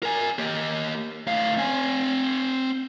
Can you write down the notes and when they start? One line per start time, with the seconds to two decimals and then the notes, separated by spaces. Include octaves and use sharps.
0.03 A#4 G#5
0.39 A#3 G4
1.27 A2 F5
1.57 C4 G#5